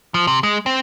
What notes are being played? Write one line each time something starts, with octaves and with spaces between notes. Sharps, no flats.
F3
C3
G#3
C4